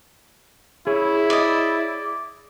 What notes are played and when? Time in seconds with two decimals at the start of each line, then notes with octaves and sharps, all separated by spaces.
0.87 E4 G#4 C#5
1.30 D5 D#5